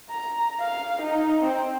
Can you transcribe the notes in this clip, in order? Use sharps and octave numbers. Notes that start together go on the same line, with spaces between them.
A#5
F5
D#4
C4